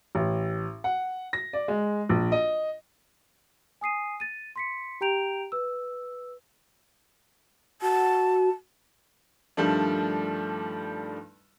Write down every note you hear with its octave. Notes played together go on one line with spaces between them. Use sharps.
A1
F#5
A#6
D5
G#3
A#1
D#5
G#5 D#6 C7 D#7
A6 D#7
C6 B6 C#7
G4 G5 A#5 G6 D7 F7
B4 E6
F#4 A5
G2 D#3 F3 G3 A3 D4